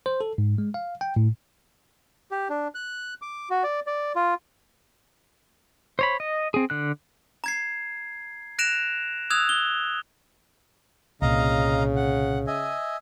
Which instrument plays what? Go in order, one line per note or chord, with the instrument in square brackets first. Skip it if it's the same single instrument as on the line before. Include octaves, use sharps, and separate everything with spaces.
[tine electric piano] C5
A4
G#2
G#3
F5
G5
A2
[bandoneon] G4
D4
F#6
D6
F#4
D5
D5
F4
[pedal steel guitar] C5 C#5 B5
D#5
C4 G#4
D3 F#6
[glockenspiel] A#5 G#6 C7
F#6 A#6 D7 E7 F7
D#6 E6 F#6 G#6 F7
G7
[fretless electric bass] C2 A#2 [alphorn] C#3 [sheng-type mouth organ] D#5 F5 A#5
[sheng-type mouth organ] F#5
D#5 E5 G#5